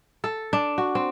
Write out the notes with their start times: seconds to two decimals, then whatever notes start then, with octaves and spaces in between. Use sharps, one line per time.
0.24 A4
0.53 D4
0.78 F#4
0.95 C4